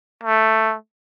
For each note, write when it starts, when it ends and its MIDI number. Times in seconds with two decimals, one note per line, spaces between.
0.23 0.74 57